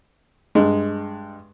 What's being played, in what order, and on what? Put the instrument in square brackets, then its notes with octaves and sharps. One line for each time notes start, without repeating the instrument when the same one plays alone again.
[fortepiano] G2 G#3